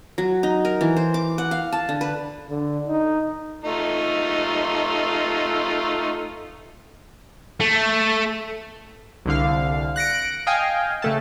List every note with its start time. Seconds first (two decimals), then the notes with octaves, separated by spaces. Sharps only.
0.18 F#3
0.43 D#4
0.65 A#4
0.81 E3
0.97 C5
1.14 D6
1.38 F#5
1.51 F5
1.73 A5
1.89 D3
2.01 B4
2.49 D3
2.87 D#4
3.64 A3 D#4 F4
7.60 A3
9.25 C2 D3 F5
9.96 F#6 A#6 C#7 D7
10.47 D#5 F5 G5 G#5
11.02 C#3 A3 A5